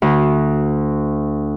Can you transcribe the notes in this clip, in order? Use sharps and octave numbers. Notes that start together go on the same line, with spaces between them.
D2